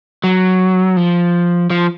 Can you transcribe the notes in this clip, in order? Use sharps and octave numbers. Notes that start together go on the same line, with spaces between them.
F#3
F3
F3